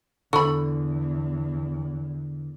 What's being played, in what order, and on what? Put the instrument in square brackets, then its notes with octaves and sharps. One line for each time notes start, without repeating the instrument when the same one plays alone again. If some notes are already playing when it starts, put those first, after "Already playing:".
[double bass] E2 [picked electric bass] D3 [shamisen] A4 B5 [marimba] C#6